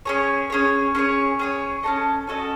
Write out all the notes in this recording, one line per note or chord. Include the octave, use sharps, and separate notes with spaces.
C#4 G#4 C#5
C#4 G#4 C#5
C#4 G#4 C#5
C#4 G#4 C#5
C#4 F#4 A4 D#5
C#4 F#4 A4 D#5